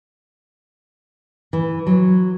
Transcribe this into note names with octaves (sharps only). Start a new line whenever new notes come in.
E3
F#3